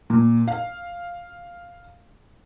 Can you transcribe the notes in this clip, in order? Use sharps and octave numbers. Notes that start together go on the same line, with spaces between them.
A#2
F5